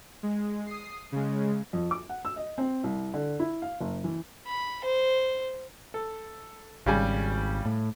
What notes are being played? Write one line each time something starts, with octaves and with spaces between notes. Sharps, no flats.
G#3
D#6 C7
C#3 G#3
F2
D6
F#5
E6
D#5
C4
C2
D3
E4
F5
F#1
E3
B5
C5
A4
G#1 C#3 G3 G#5
A2